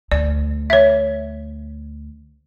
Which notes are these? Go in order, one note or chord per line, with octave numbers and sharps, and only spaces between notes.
D2 D5
C#5 E5